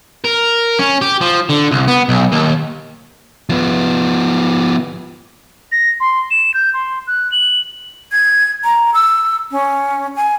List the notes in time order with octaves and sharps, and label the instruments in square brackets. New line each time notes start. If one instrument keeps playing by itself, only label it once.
[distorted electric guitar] A#4
C#4
G4
F3
D3
C2
B3
B1
D#2
[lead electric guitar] F3 B3
[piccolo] A#6
C6
E7
G6
C6
F#6
F#7
[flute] G#6
A#5
E6
C#4
G#5